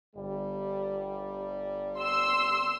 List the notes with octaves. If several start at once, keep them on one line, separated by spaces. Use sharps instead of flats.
G1 G3
C6 E6